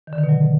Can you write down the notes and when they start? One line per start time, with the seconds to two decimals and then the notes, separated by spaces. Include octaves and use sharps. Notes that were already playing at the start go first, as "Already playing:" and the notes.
0.07 D#3
0.13 D3
0.18 D#3
0.24 B2
0.29 F#3